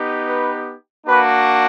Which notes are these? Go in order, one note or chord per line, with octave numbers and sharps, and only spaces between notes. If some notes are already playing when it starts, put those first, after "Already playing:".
Already playing: B3 D#4 G4
B4
A#3 D4 F#4 B4